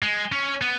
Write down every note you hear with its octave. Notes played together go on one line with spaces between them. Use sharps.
G#3
C#4
B3